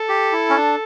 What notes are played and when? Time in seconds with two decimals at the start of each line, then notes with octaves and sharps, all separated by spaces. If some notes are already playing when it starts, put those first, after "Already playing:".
Already playing: A4
0.09 G4
0.32 E4
0.49 C#4
0.56 D4